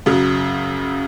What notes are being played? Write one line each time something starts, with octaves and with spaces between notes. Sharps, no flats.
F#2 C#3 F#3